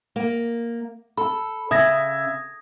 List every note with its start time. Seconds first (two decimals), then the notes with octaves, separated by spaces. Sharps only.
0.16 A#3
1.17 A4 B5
1.71 C#3 E5 D#6 G#6 A#6